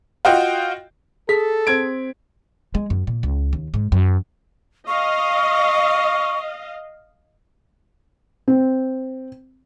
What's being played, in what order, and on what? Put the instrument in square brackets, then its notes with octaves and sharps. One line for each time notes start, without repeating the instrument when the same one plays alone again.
[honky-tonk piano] F4 F#4 D#5 G5
[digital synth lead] G#4 [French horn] A4 [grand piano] B6
[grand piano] C4 G#6 D7
[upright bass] G#3
F#2
A#2
C#2
D#2
G#2
F#2
[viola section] D#5 F5 [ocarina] C#6
[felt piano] C4